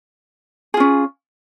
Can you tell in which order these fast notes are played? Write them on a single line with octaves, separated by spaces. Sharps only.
G#4 F4 C#4